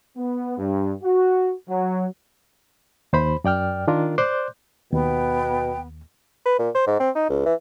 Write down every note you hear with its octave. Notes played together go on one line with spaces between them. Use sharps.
B3
G2
F#4
F#3
D#2 C5 B5
F#2 D5 G5 F6
D#3 D4 F4 A#4
C5 D5 C6 D6 F#6 G6
D#2 B2 B3 G5
B4
A#2
C5
G#2
C4
D#4
C#2
E3